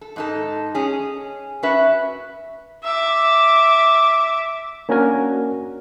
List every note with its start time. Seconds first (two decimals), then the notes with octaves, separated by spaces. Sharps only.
0.01 A4
0.16 G#2 D#4 A4
0.75 C#4 G#4
1.63 C#4 F#4 B4 E5
2.84 E5 D6
4.89 A#3 C#4 D4 F#4 A#4 G#5